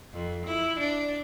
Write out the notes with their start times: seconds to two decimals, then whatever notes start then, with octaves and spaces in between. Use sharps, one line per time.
0.13 F2
0.46 E4
0.79 D4